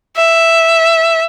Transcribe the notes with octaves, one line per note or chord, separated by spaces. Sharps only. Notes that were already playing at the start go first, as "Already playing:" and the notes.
E5